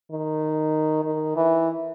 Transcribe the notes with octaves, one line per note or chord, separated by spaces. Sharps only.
D#3
D#3
E3